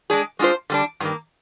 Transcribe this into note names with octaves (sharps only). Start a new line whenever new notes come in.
G#3 D4 G#4
G#3 D4 F4 C5
D3 G3 D4
G2 D#3 A#3